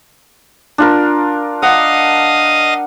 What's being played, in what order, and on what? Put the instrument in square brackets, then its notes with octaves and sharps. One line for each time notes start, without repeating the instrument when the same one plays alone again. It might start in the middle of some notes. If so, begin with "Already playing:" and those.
[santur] D4 F4 A#4
[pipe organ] D#5 F5 D#6 [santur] F#5